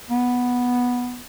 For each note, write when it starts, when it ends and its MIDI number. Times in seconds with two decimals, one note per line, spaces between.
0.11 1.21 59